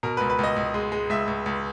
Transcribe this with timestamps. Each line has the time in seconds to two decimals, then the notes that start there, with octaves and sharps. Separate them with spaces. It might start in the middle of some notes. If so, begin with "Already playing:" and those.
0.03 B2 A#4
0.17 C#2 B4
0.30 B4
0.39 C#2 D#5
0.56 C#2
0.74 G#3
0.92 G#3
1.10 C#2 E5
1.27 C#2
1.46 C#2